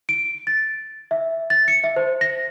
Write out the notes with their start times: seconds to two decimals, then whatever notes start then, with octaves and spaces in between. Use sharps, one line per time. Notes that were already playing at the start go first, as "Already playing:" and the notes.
0.09 D7
0.47 A6
1.11 E5
1.50 A6
1.68 C#7
1.84 E5
1.96 C5
2.21 A#6